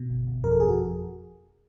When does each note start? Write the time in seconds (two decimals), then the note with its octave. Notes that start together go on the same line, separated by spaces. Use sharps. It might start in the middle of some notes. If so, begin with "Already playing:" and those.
Already playing: B2
0.10 G1
0.27 G1
0.44 F2 A#4
0.52 A4
0.60 F2 G#4
0.69 F#4